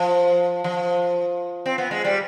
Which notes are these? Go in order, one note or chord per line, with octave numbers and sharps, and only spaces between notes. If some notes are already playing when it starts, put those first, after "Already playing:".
Already playing: F3
F3
C4
B3
G#3
G3